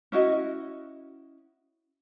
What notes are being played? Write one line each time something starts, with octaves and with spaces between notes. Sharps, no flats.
C#4 E4 F#4 D#5